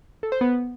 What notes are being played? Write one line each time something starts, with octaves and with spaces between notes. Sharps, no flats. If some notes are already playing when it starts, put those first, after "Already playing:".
A4
C5
B3